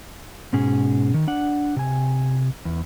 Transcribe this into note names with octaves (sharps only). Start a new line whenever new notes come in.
G#2 B2 C#4 G#4
D#3
D4 F#5
C3 G#5
E2